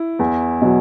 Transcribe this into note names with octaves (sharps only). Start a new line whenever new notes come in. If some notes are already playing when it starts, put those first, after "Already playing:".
Already playing: E4
E2
B2 F#3